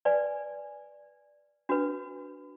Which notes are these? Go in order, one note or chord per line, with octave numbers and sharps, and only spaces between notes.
B4 D5 G#5
D4 F#4 B4